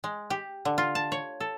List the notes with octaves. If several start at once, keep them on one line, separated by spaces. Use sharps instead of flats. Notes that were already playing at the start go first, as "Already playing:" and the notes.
G#3
G4
D3
F4
A5
C#5
A4